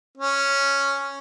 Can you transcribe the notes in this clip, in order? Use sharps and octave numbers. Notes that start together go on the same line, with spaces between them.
C#4